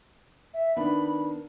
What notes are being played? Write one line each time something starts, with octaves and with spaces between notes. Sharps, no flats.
E5
D#3 B3 D4 B5